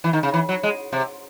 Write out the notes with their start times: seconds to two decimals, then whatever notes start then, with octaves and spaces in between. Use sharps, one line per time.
0.04 E3
0.13 D#3
0.23 C#3
0.34 E3
0.49 F#3
0.63 G#3
0.92 C3